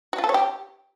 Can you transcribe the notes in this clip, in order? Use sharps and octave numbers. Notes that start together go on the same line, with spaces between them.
F#4
F4
A4
C#5
G4